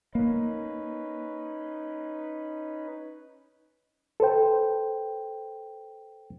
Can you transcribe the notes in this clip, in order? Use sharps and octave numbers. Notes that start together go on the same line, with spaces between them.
A#3 C#4 D#4 B4
A4 B4 C5 G5